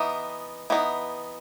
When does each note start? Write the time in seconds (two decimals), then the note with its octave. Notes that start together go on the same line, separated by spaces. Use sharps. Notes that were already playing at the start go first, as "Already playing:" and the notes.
Already playing: E3 B3 D#4
0.70 E3 B3 D#4